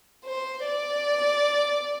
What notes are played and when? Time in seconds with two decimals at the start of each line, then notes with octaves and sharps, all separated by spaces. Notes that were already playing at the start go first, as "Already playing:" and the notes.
0.26 C5
0.65 D5